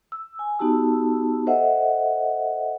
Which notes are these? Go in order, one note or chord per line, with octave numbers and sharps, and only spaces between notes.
E6
G#5
B3 D#4 F#4 G4 A5 E6
A4 C5 D#5 E5 F#5